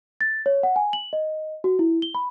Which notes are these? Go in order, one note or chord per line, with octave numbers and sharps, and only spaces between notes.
A6
C#5
F#5
G#5
F#7
D#5
F#4
E4
G7
B5